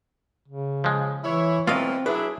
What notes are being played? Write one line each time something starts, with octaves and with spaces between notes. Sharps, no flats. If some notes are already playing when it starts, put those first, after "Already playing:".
C#3
F3 G#3
E3 E4 C#5
B2 E3 F#3 A3 C4 F4 D#5 F5
F#3 D4 E4 G#4 B4